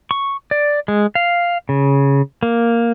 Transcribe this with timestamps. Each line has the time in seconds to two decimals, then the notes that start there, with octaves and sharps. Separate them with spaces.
0.11 C#6
0.51 D5
0.88 G#3
1.15 F5
1.69 C#3
2.43 A#3